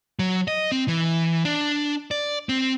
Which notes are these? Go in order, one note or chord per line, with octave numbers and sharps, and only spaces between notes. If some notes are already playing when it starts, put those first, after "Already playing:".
F#3
D#5
C4
E3
D4
D5
C4